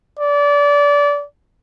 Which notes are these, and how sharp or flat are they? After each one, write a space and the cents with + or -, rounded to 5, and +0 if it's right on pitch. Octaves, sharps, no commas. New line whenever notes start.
D5 -25